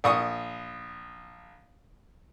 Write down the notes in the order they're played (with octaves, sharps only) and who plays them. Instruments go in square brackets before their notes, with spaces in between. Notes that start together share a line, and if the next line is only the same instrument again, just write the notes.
[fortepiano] A#1 C#6 D#6